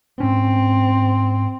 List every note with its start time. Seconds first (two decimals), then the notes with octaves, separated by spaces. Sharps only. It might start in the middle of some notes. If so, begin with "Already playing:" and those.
0.20 G#2 C4 C#4